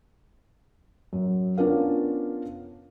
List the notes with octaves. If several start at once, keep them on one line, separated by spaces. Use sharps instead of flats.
F#2
B3 C#4 D4 F4 A#4 F5